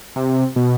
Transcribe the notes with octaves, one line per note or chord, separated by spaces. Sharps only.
C3
B2